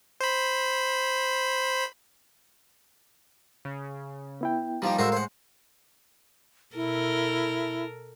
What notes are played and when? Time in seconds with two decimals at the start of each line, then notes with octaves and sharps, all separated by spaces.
0.21 C5 B5
3.65 C#3
4.41 B3 E4 G5
4.82 D#3 F3 G3 A#3
4.99 A2 G#3 F#4 A#4 C5 E5 F5 E6
5.12 C5 F#5
6.75 B2 E4 A4 A#4